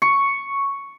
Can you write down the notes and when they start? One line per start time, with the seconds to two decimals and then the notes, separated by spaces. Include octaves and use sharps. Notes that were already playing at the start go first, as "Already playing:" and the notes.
0.02 C#6